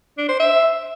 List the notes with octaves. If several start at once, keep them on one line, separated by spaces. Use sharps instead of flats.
D4
C5
E5